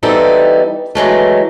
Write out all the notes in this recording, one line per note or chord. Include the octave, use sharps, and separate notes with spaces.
E3 G3 B3 C4 D#4 A4
E3 F#3 G#3 A3